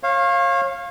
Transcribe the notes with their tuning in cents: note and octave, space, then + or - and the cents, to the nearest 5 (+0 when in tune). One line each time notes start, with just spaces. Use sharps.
C#5 -35 F5 +0